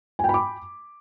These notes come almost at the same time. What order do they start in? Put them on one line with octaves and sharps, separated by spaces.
G#5 G5 B5 D6